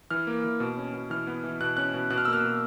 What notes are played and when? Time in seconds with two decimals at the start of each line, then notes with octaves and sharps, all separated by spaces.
0.11 E3 F6
0.27 A#3
0.44 E3
0.60 B2
0.78 C#4
0.94 B2
1.10 E3 F6
1.27 B3
1.44 E3
1.61 B2 F#6
1.77 C#4 F#6
1.94 B2
2.10 B2 F#6
2.18 F6
2.25 A#3 E6
2.33 F6
2.44 B2